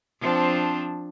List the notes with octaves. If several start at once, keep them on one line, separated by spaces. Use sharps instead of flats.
F3 C4 D4